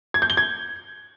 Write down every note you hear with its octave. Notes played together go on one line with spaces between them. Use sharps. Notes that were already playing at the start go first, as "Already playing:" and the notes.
G#6
G6
G7
G#6